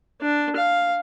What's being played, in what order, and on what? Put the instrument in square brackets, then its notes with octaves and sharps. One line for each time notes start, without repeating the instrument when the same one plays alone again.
[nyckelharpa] D4
F5